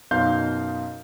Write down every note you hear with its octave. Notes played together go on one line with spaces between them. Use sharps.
F#2 B2 D#4 F5 C6 G6